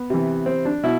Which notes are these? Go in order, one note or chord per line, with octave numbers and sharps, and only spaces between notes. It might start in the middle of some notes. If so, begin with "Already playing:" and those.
Already playing: B3
C3 E3
C4
D4
B2 E4